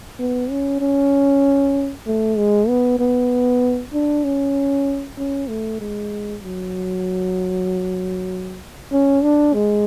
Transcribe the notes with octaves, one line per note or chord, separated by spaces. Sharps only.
B3
C#4
C#4
A3
G#3
B3
B3
D4
C#4
C#4
A3
G#3
F#3
C#4
D4
G#3